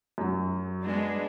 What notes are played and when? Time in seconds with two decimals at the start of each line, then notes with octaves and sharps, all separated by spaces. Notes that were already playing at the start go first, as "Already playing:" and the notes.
0.18 F#2 F#3
0.84 G#3 B3 D4